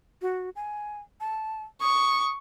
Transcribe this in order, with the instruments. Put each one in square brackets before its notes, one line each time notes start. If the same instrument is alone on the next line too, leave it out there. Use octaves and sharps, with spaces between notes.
[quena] F#4
G#5
A5
[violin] C#6 [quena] D#6